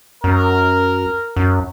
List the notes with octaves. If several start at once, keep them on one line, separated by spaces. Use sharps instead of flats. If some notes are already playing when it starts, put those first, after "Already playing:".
F#2 A#4
F#2